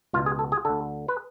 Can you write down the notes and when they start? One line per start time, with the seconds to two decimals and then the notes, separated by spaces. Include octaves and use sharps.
0.13 C#2 B2 F4
0.26 G#4
0.39 A4
0.52 G#4
0.65 D2 D3 A4
1.08 B4